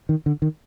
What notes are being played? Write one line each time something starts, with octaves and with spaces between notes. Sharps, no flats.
D#3
D3
D#3